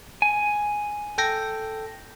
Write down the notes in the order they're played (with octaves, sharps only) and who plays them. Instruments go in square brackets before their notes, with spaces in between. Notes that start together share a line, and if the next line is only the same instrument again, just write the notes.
[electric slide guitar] G#5
[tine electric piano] A4 G5 A#6